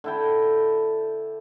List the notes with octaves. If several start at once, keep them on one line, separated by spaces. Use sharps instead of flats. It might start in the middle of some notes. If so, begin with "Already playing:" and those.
D3 E4 G5